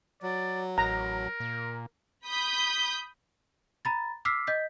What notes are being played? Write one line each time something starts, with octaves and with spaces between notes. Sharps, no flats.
F#3 D5
A1 A#4 A#5
A#2
B5 D#6 G6 B6
A#5 B5 A6
D6 E6 F6 B6 C7
D#5 G6 B6